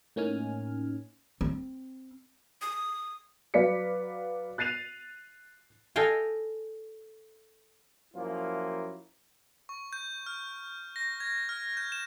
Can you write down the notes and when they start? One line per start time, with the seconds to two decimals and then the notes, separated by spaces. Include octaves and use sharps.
0.16 A2 A#3 C#4 D#4 G#5 F6
1.41 C4
2.61 D#6
3.54 F#3 B4 D5 F5 B6 C#7
4.58 F#6 A6 C7 D#7 F7
5.96 A4 D#5 F5 G5 G#5
8.14 F#2 F3 A#3 E4 F4
9.69 C#6
9.93 G6
10.26 F6
10.96 A#6
11.20 G#6
11.49 F6
11.77 G6
11.92 E7